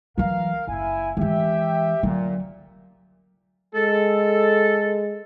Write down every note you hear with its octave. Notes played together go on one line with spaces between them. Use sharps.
E3 F#3 A#4 F5
F#1 E4 G#5
E3 G#3 G4 E5 G5
A#2 D3 F#3
G#3 A4